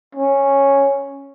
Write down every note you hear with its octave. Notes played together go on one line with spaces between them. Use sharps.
C#4